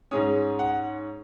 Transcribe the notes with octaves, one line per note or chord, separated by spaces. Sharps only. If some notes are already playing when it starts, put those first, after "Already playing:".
G#2 G#3 C#4 D#6
F#5